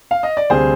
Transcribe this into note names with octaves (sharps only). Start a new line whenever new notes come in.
F5
D#5
D5
D2 C3 G3 C4 G#4 C5